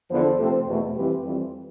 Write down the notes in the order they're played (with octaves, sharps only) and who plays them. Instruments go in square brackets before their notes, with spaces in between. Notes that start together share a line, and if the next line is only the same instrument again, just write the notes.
[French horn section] E2 D3 F3 B3 A4 C5
C3 F3 A3 C4
E2 B2 A3
F2 E3 G3 C4 G4 B4
F2 E3 G3 C4